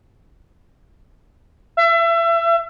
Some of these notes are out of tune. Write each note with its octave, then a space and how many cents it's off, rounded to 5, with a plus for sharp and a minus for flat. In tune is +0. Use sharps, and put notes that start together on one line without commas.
E5 +30